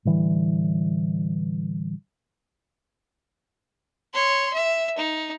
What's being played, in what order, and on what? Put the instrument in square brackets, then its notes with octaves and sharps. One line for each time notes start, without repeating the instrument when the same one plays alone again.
[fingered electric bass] A2 D3 E3 G3
[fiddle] C#5 C6
E5
D#4